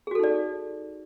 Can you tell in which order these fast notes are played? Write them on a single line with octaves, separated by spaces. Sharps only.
G#4 F#4 A4 D#4 D5